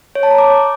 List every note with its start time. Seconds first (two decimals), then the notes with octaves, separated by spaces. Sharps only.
0.15 C#5
0.23 A5
0.31 A#5
0.38 D6